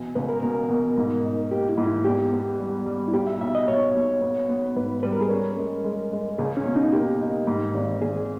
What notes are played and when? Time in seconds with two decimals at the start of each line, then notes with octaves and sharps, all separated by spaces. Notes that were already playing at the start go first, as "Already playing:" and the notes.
Already playing: B2 E3
0.15 C#2 B4
0.29 A#4
0.43 B2 A#4
0.69 B2
0.97 G#2
1.24 D#4
1.51 A#3 G4
1.69 E4
1.77 G#2
1.87 E4
2.05 E2 G4
2.32 B3
2.59 G3
2.86 G3
3.08 E4
3.13 B1 G4
3.27 E5
3.41 B1 E5
3.55 D#5
3.67 B1 C#5
3.95 B1
4.21 B3
4.49 B3
4.76 G#2 B4
5.03 G3 B4
5.12 A#4
5.21 G#4
5.30 C#4 A#4
5.57 G#3
5.84 G#3
6.12 G#3
6.38 C#2 G#4
6.57 C#4
6.65 B2
6.75 D#4
6.93 A#3 G4
7.21 D#4
7.47 G#2
7.74 G#1
8.01 G#1 G#4